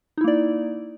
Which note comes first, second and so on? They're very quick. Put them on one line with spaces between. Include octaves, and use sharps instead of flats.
D#4 E4 A#3 D5